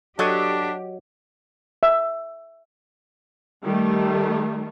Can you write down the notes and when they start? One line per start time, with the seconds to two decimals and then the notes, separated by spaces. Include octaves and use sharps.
0.19 F#3 D4 G4 A4 D#5 C#6
1.83 E5
3.63 D#3 G3 A3